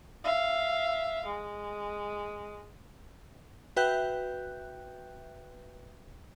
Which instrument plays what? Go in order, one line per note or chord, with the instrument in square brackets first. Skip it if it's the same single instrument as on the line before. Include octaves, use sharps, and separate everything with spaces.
[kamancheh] E5 F5
G#3
[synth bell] F#4 B4 E5 G5 F#6 G6